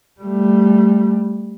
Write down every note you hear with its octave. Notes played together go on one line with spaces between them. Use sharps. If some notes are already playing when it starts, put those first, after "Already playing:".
G3 A3